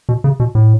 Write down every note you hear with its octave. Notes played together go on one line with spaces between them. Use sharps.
B2
C#3
B2
A2